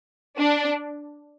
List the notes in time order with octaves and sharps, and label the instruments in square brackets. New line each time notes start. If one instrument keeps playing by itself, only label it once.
[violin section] D4